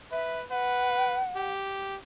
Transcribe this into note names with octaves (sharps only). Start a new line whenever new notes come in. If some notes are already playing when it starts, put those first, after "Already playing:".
B4 E5
B4 F#5
G4